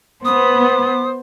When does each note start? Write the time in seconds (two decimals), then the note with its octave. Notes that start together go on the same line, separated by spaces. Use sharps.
0.25 B3 C5 D#6